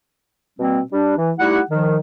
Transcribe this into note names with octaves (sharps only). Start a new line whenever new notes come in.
B2 G3 A#3 C4
G3 D4
E3
G3 A3 D#4 E4 G4 F#5
D#3 F3